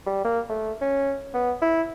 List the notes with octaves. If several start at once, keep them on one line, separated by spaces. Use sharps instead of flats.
G3
A#3
A3
C#4
B3
E4